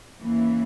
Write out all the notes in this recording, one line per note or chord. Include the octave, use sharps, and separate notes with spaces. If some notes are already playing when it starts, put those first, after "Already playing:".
D#2 C#3 E3 A#3